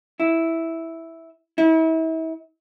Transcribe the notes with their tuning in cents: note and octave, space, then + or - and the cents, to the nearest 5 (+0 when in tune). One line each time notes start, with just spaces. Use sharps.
E4 -5
E4 -35